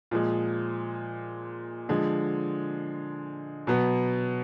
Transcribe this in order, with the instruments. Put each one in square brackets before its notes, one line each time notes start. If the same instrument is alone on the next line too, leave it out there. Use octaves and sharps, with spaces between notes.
[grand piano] A#2 F3 G#3
D3 F3 G#3
B2 F#3 B3